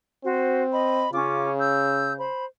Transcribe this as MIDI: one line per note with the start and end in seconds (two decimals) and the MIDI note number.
0.24 1.07 60
0.24 0.62 66
0.24 0.62 72
0.72 1.10 75
0.72 1.10 83
1.13 2.28 49
1.13 1.49 61
1.13 1.49 65
1.13 1.49 86
1.60 2.12 88
1.60 2.12 91
2.18 2.44 72
2.18 2.44 83